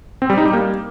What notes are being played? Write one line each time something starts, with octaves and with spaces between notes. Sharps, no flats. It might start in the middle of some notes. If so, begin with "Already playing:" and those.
C4
G3
D#4
G3
A#3